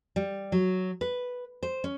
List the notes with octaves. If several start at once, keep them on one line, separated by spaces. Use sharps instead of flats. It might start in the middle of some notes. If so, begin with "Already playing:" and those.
G3
F#3
B4
C5
C#4